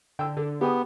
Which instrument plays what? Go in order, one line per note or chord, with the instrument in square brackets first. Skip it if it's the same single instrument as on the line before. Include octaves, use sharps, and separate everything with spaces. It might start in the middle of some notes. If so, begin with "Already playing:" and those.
[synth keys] D3 [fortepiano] G5 E6
[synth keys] D3 [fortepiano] A4
[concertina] B3 [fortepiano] G4 G#4 D#6